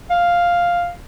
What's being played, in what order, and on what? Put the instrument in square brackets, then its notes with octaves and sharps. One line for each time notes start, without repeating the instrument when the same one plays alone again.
[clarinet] F5